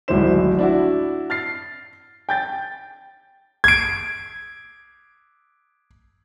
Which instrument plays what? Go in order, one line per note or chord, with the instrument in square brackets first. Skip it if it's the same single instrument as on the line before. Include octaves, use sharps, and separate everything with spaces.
[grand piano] D1 G#1 G3 E4 C5 E7
D4 E4 F#4
F6 A6 C7
G5 G6 A6
G#6 D7